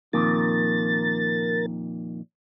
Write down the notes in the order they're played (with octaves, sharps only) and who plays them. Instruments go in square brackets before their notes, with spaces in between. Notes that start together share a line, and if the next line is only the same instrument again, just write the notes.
[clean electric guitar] F2 A#2 D#3 [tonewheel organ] A#4 A6